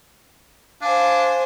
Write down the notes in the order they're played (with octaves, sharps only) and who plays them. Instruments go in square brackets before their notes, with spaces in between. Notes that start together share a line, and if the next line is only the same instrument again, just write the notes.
[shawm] D4 [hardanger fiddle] C5 G#5 [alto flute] F5